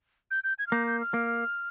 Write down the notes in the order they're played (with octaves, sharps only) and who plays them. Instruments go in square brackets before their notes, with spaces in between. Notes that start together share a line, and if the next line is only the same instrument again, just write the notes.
[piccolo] G6
G6
G#6
F6
[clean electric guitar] A#3 [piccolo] G6
[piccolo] G6
F6
[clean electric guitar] A#3